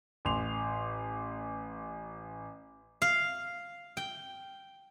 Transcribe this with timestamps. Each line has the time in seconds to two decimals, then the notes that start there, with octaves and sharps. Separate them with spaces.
0.25 A1 C6 F7
3.02 F5
3.97 G5